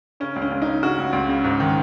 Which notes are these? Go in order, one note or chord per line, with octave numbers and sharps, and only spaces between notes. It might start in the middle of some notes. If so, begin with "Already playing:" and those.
C#3 C#4
C#2
C#4
C#2
C#3 D#4
C#3 C#4 F#4
C#2
C#2
C#3
G#2
D#3